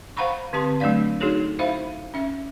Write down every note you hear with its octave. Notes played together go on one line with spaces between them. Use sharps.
C5 F5 F#5 A#5 B5 C#6
D3 C4 G4 A5 C6
F#3 A3 D4 D5 F5
D#4 F#4 G#4 A4 C#5
E4 C5 E5 F5 B5
C#4 E5